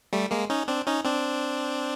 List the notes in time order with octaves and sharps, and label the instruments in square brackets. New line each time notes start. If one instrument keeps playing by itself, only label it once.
[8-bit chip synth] G3 A3
G#3 A#3
C#4 D#4
C4 D4
C#4 D#4
C4 D4